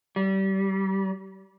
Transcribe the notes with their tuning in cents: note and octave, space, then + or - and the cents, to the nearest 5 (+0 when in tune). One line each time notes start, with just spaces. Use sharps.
G3 -25